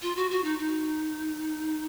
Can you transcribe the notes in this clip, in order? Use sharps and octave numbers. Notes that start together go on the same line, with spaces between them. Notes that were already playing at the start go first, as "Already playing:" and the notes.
F4
F#4
F#4
D#4
D#4